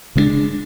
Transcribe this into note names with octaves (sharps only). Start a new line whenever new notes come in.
C#3 G#3 B3 D4